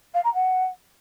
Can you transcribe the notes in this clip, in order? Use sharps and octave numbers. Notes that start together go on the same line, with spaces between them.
F5
A#5
F#5